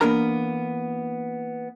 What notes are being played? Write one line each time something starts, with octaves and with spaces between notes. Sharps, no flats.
E3 A#3 B3 D4 A#4 A#5